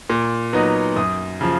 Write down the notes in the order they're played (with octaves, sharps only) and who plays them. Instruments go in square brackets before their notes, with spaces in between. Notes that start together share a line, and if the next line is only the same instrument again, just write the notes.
[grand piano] A#2
F#3 B3 D#4
F#2 D#6
C#3 F3